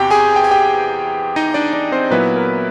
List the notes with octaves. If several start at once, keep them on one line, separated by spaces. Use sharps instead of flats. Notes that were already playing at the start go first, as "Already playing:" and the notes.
Already playing: E2 C3 E3 F#4 G4 G5
G#4 G#5
G5
G#5
G4 G5
D#4 D#5
D4 D5
D4 D5
C4 C5
A#2 F#3 B3 E4 B4
A#4